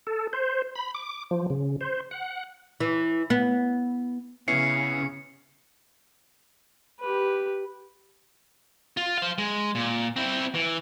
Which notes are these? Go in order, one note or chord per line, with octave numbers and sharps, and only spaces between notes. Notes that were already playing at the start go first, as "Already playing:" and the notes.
A4
C5
B5
D6
F3
C#3
C5
F#5
E3
B3
C#3 B3 C#4 E4 C7 C#7
G4 B4
F4
C5 F5
G#3
A#2
C4 E4
E3